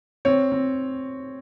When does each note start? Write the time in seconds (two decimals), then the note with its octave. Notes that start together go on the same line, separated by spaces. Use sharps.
0.25 C4 C#5
0.52 C4